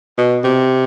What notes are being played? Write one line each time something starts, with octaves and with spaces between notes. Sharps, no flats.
B2
C3